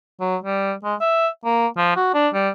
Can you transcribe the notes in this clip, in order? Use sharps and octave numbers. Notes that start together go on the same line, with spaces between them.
F#3
G3
G#3
E5
A#3
F3
F#4
D4
G3